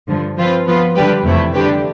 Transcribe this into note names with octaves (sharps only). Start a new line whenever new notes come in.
G2 D3 F3
F3 C4 F4 B4
F3 B3 F4 B4
D3 G3 D4 G4 B4
F2 C3 E3 A3 E4
D3 G3 D4 G4 B4